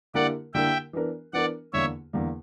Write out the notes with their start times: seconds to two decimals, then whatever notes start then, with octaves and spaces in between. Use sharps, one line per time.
0.14 D3 A#3 E4 G4 A#4 D5 F#5
0.54 D3 A#3 E4 G4 A#4 E5 G5
0.93 E3 B3 D4 A#4
1.33 E3 B3 D4 A#4 D5 F#5
1.73 E2 D3 A#3 C#5 E5
2.13 E2 D3 A#3